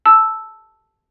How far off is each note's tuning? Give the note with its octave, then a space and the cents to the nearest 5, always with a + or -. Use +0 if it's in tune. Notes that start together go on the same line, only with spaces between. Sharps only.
A5 +0 E6 +0